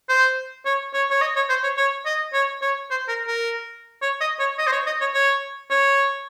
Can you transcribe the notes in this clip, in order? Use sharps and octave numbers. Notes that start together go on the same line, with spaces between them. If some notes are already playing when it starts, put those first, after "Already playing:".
C5
C#5
C#5
C#5
D#5
C#5
C5
C#5
C#5
D#5
C#5
C#5
C5
A#4
A#4
C#5
D#5
C#5
D#5
C5
C#5
D#5
C#5
C#5
C#5